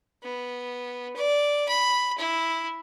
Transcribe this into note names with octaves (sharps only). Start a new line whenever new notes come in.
B3
D5
B5
E4